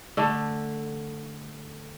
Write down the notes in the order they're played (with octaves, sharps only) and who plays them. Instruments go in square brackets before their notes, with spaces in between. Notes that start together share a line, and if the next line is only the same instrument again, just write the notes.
[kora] D3 A3